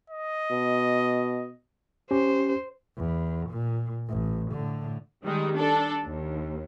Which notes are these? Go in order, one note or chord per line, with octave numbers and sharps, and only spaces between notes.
D#5
B2
C#4 G4 C5
E2
A#2
A1
A2 D3
D#3 G3 G#3 D#4
D4 A4
D#2